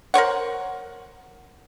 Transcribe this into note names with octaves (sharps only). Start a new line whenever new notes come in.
A#4 C5 C#5 F#5